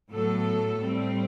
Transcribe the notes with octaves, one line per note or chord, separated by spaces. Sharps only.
A2 F#3 B3 A4
A2 G3 C4